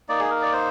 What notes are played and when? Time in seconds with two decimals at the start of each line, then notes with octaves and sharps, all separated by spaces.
0.09 A#3 D#4 D5
0.20 G#4
0.31 A#4
0.42 D5
0.52 C5